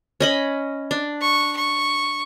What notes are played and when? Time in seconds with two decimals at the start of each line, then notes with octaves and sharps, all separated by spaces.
0.20 C#4 D#5 B5
0.91 D4
1.21 C#6
1.57 C#6